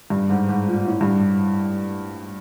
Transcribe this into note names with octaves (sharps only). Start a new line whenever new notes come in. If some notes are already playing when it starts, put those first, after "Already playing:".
G2
G#2
G#2
A#2
A2
G2